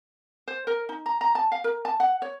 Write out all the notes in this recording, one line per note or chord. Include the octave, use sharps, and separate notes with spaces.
C5
A#4
D#4
A#5
A#5
A5
F5
A#4
A5
F#5
C#5